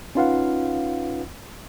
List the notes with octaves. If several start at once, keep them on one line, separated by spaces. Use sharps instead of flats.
C#4 D#4 F4 B4 F5 F#5